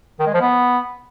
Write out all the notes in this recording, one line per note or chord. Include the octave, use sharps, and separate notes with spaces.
D#3
G#3
F3
B3